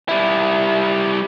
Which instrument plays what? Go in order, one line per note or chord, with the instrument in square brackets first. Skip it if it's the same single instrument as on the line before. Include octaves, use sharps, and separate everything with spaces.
[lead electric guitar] G3 E4